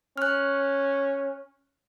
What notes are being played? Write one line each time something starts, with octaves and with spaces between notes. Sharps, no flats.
C#4 F6 F#6